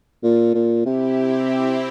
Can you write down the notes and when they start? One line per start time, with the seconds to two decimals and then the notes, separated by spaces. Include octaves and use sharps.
0.23 A#2 F4 A4
0.54 A#2
0.86 C3 E4 G4
1.16 C4 E4